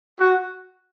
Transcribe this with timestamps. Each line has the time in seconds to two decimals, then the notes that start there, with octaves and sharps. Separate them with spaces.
0.20 F#4